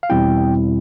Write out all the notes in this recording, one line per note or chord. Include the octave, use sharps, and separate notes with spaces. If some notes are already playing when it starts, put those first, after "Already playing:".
F5
E2 B2 G3 C4 E4 G5